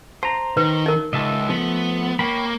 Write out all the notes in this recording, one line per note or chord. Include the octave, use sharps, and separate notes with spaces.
C5 A5 A#5
D#3 B4
D#4 A#4
C#2 D#5 E5 A5
F3 A3 B3
A#3 C#5 G5 B5